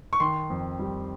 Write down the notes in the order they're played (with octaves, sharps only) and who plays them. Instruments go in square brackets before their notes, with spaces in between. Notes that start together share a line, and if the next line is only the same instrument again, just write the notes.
[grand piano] C#6
D#3 C6
F2
G3